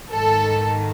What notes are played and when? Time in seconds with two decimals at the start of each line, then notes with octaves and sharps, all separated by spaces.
0.11 G#2 D#3 A4